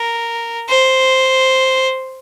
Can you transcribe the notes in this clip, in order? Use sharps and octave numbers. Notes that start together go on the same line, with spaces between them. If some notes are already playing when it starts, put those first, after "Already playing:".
Already playing: A#4
C5